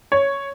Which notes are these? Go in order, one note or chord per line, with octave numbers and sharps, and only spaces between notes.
C#5